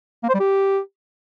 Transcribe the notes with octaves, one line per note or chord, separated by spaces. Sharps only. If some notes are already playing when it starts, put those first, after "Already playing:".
A#3
C5
G3
G4